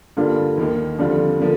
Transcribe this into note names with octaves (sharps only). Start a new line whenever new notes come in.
G2 D3 G3 A#3 F4
D#2 D#3 A#3
F2 D3 G3 C4 F4
D3 F3 A#3